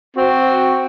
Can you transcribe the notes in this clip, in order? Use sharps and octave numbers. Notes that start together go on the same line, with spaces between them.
C4 F#4